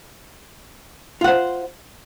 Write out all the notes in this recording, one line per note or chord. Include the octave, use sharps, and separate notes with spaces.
F4 C5 F#5